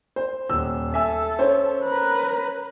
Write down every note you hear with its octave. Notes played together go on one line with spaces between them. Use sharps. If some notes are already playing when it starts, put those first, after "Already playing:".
C5
D#1 E6
A4 E5 G#5 E6
C#4 C5 C#5
A#4 B4